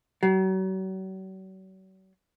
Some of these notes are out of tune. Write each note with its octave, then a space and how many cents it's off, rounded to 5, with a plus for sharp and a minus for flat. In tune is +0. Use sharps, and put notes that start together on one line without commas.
F#3 +40